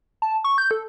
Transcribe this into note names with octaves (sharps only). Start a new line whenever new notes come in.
A5
C#6
G6
A4